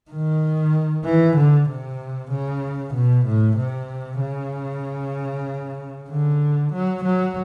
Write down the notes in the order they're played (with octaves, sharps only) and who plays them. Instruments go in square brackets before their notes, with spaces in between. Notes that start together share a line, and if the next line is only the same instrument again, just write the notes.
[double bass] D#3
E3
D3
C3
C#3
B2
A2
C3
C#3
D3
F#3
F#3